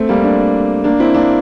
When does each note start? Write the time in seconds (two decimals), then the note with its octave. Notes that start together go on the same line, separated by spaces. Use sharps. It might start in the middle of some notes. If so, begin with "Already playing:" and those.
Already playing: A3 C4
0.09 G3 A#3
0.24 A#3 D4
0.84 A#3 D4
1.00 C4 E4
1.14 A#3 D4